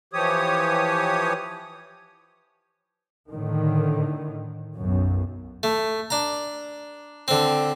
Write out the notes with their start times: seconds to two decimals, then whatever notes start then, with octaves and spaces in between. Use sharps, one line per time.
0.13 E3 F3 G4 C#5 D#6
3.32 A2 D3 D#3
4.78 B1 F#2
5.63 A3
6.10 D4 A#5
7.28 D3 C4